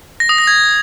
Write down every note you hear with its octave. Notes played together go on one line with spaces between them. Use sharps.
A#6
D#6
A#6
G#6